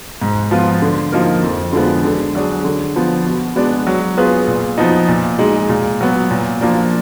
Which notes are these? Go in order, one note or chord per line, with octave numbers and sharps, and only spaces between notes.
G#2
F3 B3 F4
D3
F3 A#3 D#4 A#4
F2
D3 F3 G#3 B3
D3
F#3 D4 G#4
D3
F3 B3
B2
G#3 B3 D4
F#3
B3 F4 G#4 B4
A#2
F3 B3 D#4
A#2
G#3 D#4 G#4
A#2
F#3 B3
A#2
F3 A#3 D4